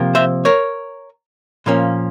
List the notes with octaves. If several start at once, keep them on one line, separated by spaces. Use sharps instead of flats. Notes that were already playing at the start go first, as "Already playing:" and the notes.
Already playing: C3 F3 A#3
C5 E5
A#4 C#5
A#2 F3 A#3 C#4